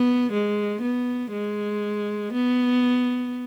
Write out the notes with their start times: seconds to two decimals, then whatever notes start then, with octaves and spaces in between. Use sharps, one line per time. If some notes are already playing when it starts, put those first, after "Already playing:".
Already playing: B3
0.32 G#3
0.82 B3
1.32 G#3
2.33 B3